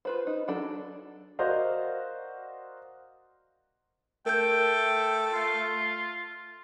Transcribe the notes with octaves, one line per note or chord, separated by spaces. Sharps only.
F4 B4 C5
D#4
F#3 D4 A4
F#4 A#4 C5 D5 D#5 F5
A3 A#4 G5 G6
F4